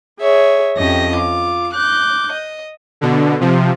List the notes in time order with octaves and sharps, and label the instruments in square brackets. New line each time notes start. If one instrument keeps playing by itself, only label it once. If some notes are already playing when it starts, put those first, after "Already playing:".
[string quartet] G#4 C#5 E5
F2 C#4 G4 D#5 A#6
F4 D6
D6 F#6 G6
D#5
[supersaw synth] B2 D3
C3 F3